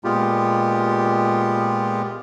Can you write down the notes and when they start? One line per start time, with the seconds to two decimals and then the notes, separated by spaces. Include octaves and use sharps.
0.04 A#2 G#3 B3 F4 G4